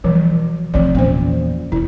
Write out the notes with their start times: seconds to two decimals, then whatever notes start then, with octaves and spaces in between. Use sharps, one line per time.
0.04 B2 E3 F3 G3
0.74 F1 D#3 F3 C4 D5
0.95 E2 A#2 B3 C#4 C5
1.72 E1 E4